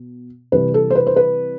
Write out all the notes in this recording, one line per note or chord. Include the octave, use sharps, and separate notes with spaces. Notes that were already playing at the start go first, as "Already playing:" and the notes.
Already playing: B2
C3 E3 G3 B4
A4
C5
B4
C5
B4